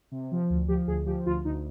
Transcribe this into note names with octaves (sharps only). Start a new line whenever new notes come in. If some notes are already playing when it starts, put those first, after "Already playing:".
C3
F3
D2
F3 G4
D2 G#4
F3 G4
D2 F4
D2 D#4